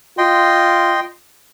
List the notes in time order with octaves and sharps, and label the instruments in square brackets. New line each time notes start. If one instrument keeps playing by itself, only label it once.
[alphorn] F4 [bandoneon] D#5 G5 C6